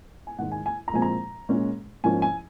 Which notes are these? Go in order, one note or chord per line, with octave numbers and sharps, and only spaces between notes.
G#5
G#2 D#3 G#3 F#5
G#5
G#5
A#5
A#2 F3 G#3 C4 G#5
A#5
A#2 G#3 C#4
G#2 F3 A#3 C#4 G#5
G#5